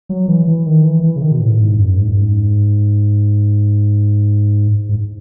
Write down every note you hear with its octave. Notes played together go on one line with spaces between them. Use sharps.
F#3
E3
E3
D#3
E3
E3
C#3
D#3
B2
A2
G#2
F#2
G#2
F#2
G#2
G#2